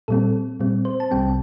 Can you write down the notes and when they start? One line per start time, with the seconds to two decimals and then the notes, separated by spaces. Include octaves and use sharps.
0.08 A#2 G3 C4 A4
0.60 A#2 G3 C4
0.85 C5
1.00 A5
1.11 C2 C3 G3 C4 G5